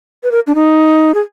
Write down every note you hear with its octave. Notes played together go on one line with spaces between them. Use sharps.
B4
A#4
D4
D#4
G#4